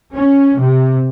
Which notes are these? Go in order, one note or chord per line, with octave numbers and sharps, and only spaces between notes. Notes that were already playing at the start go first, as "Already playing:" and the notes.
C#4
C3